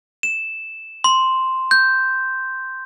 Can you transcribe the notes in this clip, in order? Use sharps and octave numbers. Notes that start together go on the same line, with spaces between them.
E7
C6
G6